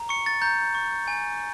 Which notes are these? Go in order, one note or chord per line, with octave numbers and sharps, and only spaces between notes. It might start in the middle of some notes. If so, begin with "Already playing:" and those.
Already playing: A#5
C#6 C#7
A6
A#5 G6
C#6
G#5